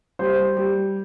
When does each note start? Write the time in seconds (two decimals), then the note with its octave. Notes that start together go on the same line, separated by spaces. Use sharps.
0.19 G3 C5
0.57 G3